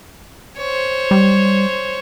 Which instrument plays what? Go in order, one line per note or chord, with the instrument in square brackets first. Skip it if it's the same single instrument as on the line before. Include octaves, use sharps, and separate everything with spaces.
[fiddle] C5 C#5
[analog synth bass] G3